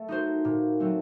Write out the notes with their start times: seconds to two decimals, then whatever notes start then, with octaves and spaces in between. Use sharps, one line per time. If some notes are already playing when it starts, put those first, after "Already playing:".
Already playing: A3
0.08 D#4 F#4 C5
0.45 A#2
0.80 F#3 A3 C4